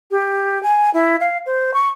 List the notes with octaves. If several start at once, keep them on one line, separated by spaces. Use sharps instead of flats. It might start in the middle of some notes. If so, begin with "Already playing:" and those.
G4
G#5
E4
F5
C5
C#6